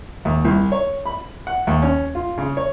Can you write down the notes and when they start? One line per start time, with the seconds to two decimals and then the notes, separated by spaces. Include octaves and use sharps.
0.25 D#2
0.45 C2
0.72 C#5
1.06 B5
1.47 F#5
1.67 D#2
1.82 C#4
2.15 F4
2.38 C#3
2.57 C#5